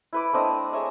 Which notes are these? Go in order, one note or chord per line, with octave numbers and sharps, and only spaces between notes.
E4 B4 D6
A3 C4 D4 D#5
G#4 C#5 E5 A#5